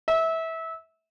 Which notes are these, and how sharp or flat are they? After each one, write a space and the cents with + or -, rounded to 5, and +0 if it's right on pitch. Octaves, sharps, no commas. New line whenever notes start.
E5 -20